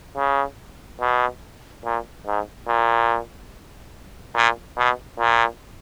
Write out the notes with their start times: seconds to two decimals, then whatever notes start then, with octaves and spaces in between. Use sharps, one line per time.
0.17 C#3
1.00 B2
1.85 A#2
2.27 G#2
2.68 A#2
4.35 A#2
4.78 B2
5.19 A#2